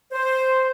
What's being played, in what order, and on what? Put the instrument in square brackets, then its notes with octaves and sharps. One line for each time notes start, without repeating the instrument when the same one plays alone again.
[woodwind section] C5